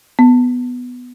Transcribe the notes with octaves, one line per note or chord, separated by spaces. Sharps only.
B3